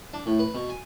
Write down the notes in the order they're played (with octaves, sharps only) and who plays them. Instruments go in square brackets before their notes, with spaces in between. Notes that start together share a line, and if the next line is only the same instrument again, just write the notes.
[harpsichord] D4
A2
B4
B2
G#5